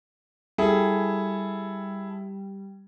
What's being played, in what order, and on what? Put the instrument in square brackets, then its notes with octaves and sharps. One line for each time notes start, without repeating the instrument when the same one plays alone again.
[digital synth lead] G3 [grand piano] E4 G#4 A4